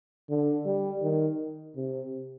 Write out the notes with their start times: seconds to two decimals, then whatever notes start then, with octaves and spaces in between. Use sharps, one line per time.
0.30 D3
0.65 G3
1.02 D#3
1.76 C3